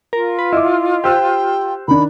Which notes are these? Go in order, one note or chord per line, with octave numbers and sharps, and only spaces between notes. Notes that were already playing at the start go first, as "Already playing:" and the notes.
F4 A#4
B4
E4 D#5 E5 D6
G4 C5 G5 E6 F#6
D#3 D4 B5